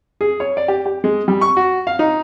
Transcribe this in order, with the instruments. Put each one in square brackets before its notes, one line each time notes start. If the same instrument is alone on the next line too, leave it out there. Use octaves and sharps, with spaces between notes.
[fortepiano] G#4
C#5
D5
G4
G4
G#3
G3
C#6
F#4
F5
D#4